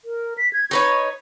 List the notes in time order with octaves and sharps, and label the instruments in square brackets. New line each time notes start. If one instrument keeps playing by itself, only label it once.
[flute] A#4
B6
G#6
[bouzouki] D#4 B4 C#5 [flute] C#6